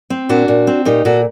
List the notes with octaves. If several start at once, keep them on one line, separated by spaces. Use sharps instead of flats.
C4
A#2 D4 F#4
A#2
C4
A#2 D#4 G4
A#2 F#4 A4